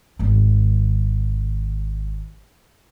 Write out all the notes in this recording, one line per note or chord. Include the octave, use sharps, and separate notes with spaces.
G#1 D#3